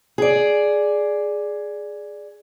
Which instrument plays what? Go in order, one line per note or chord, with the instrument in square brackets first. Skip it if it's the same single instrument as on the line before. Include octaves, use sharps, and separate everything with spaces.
[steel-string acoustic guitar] G#4 D5